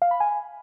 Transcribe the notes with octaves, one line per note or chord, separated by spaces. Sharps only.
F5
B5
G#5